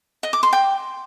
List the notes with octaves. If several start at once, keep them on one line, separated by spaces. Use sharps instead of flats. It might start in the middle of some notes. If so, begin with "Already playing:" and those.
D#5
D6
C6
G5